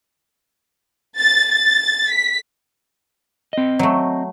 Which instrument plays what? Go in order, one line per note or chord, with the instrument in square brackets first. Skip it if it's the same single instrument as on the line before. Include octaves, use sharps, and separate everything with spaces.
[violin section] A6
A6
B6
[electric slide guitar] C4 D#5
[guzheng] F#3 A3